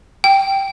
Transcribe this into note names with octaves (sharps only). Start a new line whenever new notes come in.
G5